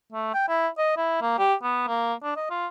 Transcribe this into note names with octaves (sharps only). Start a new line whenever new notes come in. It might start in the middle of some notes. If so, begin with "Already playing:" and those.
A3
G5
E4
D#5
E4
A#3
G4
B3
A#3
D4
D#5
F4